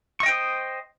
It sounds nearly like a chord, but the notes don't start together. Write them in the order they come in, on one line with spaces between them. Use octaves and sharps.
C#6 D#5 G5 C5 D#6